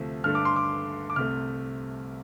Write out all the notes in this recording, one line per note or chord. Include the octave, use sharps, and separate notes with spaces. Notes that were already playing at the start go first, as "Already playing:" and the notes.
Already playing: D2 C3 F3 A3
G2 D3 A3 F6
D6
C6
D6
D6
C2 C3 A3 F6